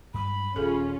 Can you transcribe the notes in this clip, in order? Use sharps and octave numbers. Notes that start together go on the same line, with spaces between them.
G2 G3 G#3 B5
D#1 C#4 F4 G#4 A4